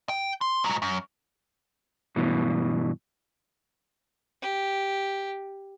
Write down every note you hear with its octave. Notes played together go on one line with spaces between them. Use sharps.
G5
C6
G#2 F#3
F#2
G2 B2 E3
G4